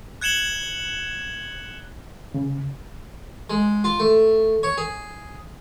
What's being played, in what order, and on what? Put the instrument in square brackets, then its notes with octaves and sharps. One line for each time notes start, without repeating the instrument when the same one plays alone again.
[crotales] F#6 G#6 C#7 E7 F#7 G7
[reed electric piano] C#3
[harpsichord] G#3
F4
A3
C#5
G#4